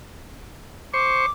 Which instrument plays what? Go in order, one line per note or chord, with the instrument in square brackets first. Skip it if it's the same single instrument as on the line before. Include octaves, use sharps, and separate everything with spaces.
[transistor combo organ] C5 C#6 [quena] D6